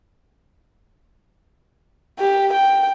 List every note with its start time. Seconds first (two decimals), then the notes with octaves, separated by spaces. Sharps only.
2.19 G4
2.53 G5